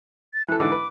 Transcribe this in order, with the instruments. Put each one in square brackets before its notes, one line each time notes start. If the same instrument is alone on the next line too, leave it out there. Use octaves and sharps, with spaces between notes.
[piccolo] A6
[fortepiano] E3 A4 [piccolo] F#6
[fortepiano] G#2 D3 E3 [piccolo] D6
[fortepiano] B4